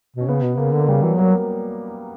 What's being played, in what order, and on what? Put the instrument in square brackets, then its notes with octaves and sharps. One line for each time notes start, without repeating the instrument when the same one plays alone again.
[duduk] B2 [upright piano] C#4
[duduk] C#3 [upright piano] B3
[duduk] B2
[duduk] C#3 [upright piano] A#3
[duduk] D3
[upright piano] A#3
[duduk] C#3 [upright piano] G3
[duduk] E3 [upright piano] F#3
[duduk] F#3 [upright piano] A#3